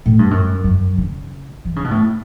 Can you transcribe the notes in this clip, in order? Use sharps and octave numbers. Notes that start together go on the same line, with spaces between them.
A2
G2
F#2
F#2
C#3
E3
C#3
B2
A2